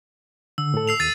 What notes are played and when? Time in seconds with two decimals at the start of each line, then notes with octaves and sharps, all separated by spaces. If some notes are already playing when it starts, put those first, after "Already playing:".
0.58 D3 E6
0.74 A2 A4
0.88 E6 C7 F7
1.00 D#2 A6 D#7